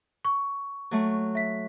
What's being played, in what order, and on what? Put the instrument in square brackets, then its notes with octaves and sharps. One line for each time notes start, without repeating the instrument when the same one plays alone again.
[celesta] C#6
[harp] F#3 A3
[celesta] E5 B6